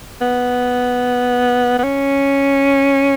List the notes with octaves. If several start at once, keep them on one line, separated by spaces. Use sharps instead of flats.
B3
B3
C#4